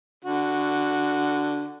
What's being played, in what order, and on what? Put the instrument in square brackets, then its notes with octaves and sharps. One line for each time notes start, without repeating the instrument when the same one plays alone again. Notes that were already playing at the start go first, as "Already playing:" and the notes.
[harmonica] D3 F#4